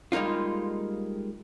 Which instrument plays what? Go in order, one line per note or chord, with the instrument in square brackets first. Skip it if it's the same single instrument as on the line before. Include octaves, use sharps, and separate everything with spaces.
[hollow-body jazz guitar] G3 G#3 A#3 D#4 F4